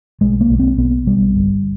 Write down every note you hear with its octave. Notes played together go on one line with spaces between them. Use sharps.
B1 G#3
A#3
B1
C4
B1 B3
B1 G3
G1